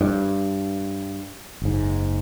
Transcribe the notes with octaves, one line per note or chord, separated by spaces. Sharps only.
G2
F#1 G#2